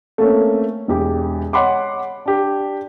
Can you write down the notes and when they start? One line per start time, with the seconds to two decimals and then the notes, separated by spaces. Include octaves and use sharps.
0.18 A3 A#3 C4 C#4
0.88 E1 E2 G4
1.53 C#5 D#5 F#5 B5 C6 D6
2.26 D4 G4